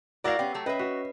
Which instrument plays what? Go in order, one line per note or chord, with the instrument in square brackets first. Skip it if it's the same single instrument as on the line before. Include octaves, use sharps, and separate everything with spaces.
[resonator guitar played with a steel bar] E4 F#4 A#4 [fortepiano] D5 F5
[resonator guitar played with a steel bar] B3 C#4 [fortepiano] G4 [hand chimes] G5 C7
[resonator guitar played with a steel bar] F#3 A3
[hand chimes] C#4 C#5 C7 [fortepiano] B4 [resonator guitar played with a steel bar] D#5 E5
[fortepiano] F#4 [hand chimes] B4 B6